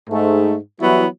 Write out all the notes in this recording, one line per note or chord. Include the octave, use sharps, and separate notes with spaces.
G#2 A3
E3 F#3 G3 B3 E4 F#4